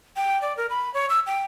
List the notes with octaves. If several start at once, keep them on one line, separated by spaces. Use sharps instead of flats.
G5
D5
A#4
B5
C#5
E6
G5